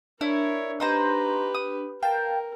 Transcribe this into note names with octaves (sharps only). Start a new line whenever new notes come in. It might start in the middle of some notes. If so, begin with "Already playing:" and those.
D4 E4 A#4 C#5
D#4 G4 B4 C5 A#5
D#6
A#4 F5 G5 A5